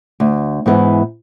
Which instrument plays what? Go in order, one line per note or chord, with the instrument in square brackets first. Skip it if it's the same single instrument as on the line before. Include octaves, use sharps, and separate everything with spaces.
[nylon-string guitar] D2
G#2 E3 B3 E4